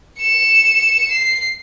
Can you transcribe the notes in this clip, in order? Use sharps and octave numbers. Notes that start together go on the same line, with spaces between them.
C#7 E7
C7